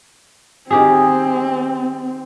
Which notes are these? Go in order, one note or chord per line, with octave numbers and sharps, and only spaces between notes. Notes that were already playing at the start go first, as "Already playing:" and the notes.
D#3 C4 G4 G#4